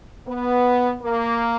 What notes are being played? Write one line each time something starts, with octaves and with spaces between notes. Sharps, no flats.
B3
A#3